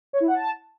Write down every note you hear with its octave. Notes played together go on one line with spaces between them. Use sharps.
C#5
E4
F#5
A5